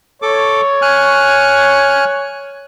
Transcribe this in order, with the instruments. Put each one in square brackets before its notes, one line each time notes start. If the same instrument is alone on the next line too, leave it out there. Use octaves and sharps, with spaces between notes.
[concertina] A4 D6 [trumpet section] C#5
[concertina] G#5 F6 F#6